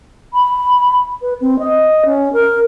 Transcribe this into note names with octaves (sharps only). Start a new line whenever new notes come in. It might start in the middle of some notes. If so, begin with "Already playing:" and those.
B5
B4
C4
D#5
C#4
A#4